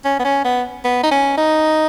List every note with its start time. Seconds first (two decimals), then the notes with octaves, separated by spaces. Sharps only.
0.05 C#4
0.19 B3
0.25 C#4
0.45 B3
0.85 B3
1.04 D#4
1.11 C#4
1.38 D#4